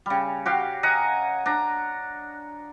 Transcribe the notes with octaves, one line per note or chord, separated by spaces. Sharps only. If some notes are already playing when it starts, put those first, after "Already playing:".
C#3 G3
F#4 G4 F5
D#5 F#5 G#5 A#5
D4 A#5